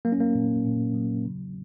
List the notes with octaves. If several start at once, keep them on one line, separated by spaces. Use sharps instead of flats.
F#3 A#3
C#4
A#3
A#2
A#2
F#3
C#3